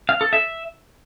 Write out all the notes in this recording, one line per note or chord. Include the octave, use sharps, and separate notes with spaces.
F5
A4
E5